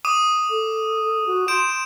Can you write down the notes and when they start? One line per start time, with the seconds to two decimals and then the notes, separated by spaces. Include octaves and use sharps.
0.05 D6 D#6 D#7
0.50 A4
1.27 F#4
1.48 C6 G6 D7 E7